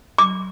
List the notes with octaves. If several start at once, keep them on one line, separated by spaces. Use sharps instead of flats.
D6